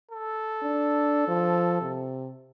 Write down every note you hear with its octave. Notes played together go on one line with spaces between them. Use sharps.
A4
D4
F3
C3